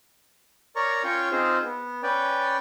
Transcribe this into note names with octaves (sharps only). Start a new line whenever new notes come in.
A#4 C#5 D5 A#5 C#6
C#4 F4 C#5 G5 C#6
C4 D#4 F4 G#4 C5
B3
C#4 B4 D5 G5